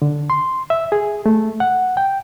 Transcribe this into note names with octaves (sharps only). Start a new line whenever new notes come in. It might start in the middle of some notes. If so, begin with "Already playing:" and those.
D3
C6
E5
G#4
A3
F#5
G5